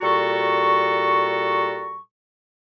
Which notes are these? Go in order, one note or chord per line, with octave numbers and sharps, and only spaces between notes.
A#2 G3 F#4 A4 A#5 C#6